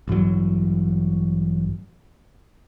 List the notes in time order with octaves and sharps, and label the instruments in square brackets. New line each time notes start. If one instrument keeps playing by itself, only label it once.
[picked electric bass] A1 G2 E3 F#3